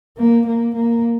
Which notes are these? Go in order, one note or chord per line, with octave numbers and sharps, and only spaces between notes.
A#3
A#3
A#3